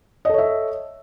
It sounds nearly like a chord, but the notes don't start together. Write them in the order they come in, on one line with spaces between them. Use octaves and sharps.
D#5 A4 C#5 E5